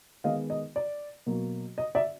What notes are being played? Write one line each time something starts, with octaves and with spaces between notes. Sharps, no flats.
D#3 G#3 B3 D#5 F5
D#5
D5
B2 F#3 A#3
D#5
D5 E5